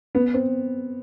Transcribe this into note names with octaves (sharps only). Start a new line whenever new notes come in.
B3
C4